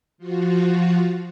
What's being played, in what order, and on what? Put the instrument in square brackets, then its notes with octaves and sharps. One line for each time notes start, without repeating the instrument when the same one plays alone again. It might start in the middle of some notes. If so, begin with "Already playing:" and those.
[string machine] F3 F4 F#4